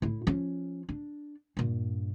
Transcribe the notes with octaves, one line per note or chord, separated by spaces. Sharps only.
A2 E4
F3 C#4
D4
G2 A#2